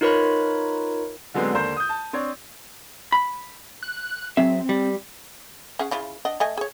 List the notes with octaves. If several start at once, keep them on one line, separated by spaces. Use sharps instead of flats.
D#4 F4 A#4 B4 C#5 B5
D3 F#3 G#3 B3 C4
D#2 D3 A#4 C5 G6
D#6 G6
A5
C4 D4 C#5
B5
F#6
F#3 C4 G#4 E5
G3
C#4 G#4 F#5
C#3 E4 F4
D4 D#5 F#5
A3 D#5 G#5
G#4 C#5